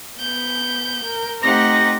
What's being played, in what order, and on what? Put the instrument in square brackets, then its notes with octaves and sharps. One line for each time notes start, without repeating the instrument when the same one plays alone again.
[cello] B3 [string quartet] G6
[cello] A#4
[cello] A3 G4 [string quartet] C4 D#4 F#5 [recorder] A#6